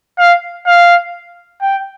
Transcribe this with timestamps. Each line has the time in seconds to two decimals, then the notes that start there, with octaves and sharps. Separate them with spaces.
0.19 F5
0.67 F5
1.62 G5